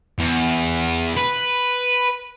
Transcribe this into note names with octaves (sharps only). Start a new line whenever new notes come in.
E2
B4